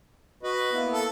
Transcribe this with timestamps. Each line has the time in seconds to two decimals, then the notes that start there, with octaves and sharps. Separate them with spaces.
0.43 F#4 B4 D#5
0.73 A#3 B3 E4
0.93 A4